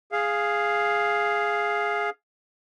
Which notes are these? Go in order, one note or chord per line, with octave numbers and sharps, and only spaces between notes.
G#4 F5